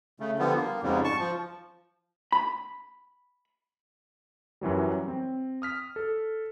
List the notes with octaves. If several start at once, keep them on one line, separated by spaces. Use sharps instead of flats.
C#3 A3
D3 F3 G3 B3
A#3
F2 G#2 C#3 G3
A5 C#6
F3
B5
F#2 E3 F#3 G3
C4
D#6 F6 B6
A4